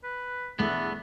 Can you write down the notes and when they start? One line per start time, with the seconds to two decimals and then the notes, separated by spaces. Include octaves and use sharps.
0.04 B4
0.59 B1 E2 G3 A3 B3 D4